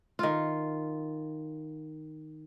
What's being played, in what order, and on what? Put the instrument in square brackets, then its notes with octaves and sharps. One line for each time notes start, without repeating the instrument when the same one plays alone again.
[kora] D#3 F4